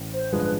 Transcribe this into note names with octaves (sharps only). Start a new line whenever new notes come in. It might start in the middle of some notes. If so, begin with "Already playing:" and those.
Already playing: A1
C5
G2 D3 F3 G#3 B4
B4